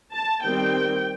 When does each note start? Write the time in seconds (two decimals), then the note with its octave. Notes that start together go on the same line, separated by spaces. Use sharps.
0.12 A5
0.44 D#3 G3 C4 G5